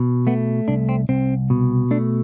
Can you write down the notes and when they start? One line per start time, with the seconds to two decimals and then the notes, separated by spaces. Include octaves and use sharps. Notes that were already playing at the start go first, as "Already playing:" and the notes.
Already playing: B2
0.27 A3 B3
0.68 C2 D4
0.89 C4
1.09 C2 C4
1.50 B2
1.91 A3 D4